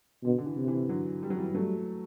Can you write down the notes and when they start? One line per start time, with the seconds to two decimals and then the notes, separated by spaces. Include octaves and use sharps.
0.24 B2 D3
0.38 D3
0.46 E3
0.57 C3
0.68 E3
0.89 D3 F#3
1.23 G3
1.30 F#3
1.38 E3 G3
1.54 F#3 G3 A3